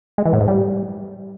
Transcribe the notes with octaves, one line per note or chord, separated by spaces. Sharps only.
G#3
E3
A2
G#2
G3